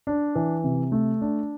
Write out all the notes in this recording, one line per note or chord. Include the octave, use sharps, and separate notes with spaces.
D4
E3
C3
A3
D4